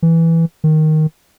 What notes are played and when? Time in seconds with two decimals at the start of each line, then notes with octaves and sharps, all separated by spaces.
0.02 E3
0.64 D#3